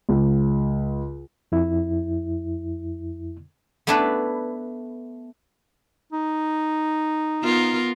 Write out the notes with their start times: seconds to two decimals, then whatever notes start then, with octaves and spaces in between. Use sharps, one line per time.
0.09 C#2
1.52 F2 E4
3.87 A3 B3 D4 E4 A4 B4
6.13 D#4
7.42 B3 F4 A#4